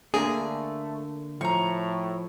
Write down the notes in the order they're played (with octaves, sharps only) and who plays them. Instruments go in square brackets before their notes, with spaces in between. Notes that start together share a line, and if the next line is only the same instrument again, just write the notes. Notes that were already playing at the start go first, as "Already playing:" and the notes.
[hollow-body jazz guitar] D3 A#3 D4 [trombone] A3 [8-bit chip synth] G#4
[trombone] A2 [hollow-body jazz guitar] F3 [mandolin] A#5 C#6